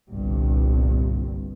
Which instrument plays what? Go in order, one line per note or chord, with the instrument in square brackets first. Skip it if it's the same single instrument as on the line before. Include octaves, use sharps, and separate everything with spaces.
[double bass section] G1 C2 G2 A#2